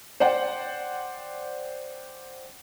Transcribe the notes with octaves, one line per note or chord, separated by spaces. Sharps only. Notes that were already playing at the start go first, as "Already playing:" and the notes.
C5 D5 F#5 G5